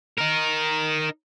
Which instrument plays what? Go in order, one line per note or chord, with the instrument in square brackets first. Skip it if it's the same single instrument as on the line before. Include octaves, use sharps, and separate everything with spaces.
[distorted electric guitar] D#4 A#4